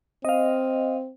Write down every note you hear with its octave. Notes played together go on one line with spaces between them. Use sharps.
C4 D#5 F5